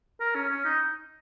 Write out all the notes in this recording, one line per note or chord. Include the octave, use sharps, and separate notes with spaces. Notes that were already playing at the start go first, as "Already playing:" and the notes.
A#4
C#4
C#4
D#4